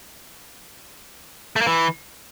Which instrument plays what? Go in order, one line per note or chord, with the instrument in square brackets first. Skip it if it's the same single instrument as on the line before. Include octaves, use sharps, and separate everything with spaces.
[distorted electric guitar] A3
A#3
E3